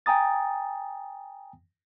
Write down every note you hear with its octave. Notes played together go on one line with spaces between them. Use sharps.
G5 G#5 A#5 D#6 A6